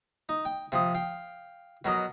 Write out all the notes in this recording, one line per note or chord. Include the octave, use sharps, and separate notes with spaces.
D#4
G5
C3 F3 D#6
F5 G5
B2 F#3 A#4 D#5